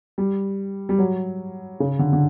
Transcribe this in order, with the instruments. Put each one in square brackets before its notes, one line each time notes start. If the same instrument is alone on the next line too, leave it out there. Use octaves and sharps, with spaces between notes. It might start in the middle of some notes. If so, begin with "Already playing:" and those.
[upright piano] G3
G3
F#3
C#3
D3
D3